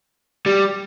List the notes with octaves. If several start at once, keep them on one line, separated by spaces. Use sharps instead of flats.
G3